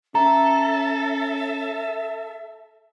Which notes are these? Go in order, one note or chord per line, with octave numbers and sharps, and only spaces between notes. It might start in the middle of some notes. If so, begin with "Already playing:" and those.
C#4 A4 E5 A#5